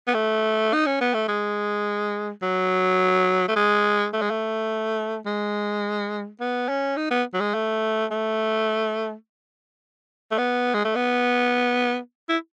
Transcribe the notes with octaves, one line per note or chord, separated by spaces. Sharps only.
B3
A3
D#4
C#4
B3
A3
G#3
F#3
A3
G#3
A3
G#3
A3
G#3
B3
C#4
D#4
B3
F#3
G#3
A3
A3
A3
B3
G#3
A3
B3
E4